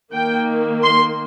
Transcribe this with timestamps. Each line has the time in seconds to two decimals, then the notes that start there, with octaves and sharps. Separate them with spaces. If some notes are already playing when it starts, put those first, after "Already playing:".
0.13 D#3 A#3 G5
0.83 C6